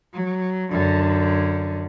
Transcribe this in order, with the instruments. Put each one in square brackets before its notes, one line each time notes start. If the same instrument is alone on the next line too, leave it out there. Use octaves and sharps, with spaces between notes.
[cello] F#3
F#2 D3